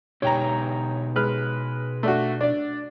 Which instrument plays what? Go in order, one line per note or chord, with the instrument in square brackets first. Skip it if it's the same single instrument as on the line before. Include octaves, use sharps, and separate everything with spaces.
[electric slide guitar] B2 D#4 G4 [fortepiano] C#5 G5 A#5
[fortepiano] G#3 B4 F6
A3 D4 F#4
D4 D5